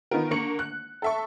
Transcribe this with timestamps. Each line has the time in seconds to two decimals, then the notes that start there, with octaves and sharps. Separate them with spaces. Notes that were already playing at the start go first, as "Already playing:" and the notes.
0.11 D#3 B3 D#4 F4 A#4
0.31 D3 A#3 C#6 C#7 F#7
0.59 F#6
1.02 A4 E5 C#6